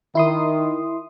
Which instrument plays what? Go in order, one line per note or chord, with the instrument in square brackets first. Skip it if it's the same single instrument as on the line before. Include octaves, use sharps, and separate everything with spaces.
[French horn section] D#3 [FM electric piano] E4 C6 D#6